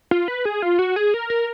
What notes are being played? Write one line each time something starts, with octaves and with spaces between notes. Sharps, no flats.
F4
B4
G#4
F4
F#4
G#4
A#4
A#4